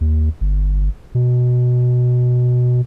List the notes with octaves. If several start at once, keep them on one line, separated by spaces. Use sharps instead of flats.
D#2
G1
B2